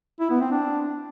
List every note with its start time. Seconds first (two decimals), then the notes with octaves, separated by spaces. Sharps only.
0.20 E4
0.31 B3
0.41 C4
0.51 D4